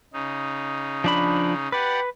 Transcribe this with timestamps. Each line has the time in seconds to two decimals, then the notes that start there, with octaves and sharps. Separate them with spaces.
0.13 C#3 D#4
1.04 F3 D4 B5
1.72 G4 B4 D5 F#5